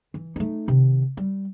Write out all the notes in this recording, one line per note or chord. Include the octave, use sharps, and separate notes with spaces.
E3
A3 D#4
C3 D#3
G3